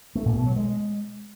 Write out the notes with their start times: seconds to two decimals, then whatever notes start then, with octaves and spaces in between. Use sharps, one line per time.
0.15 A3
0.26 A#2
0.36 B2
0.46 F#3
0.56 G#3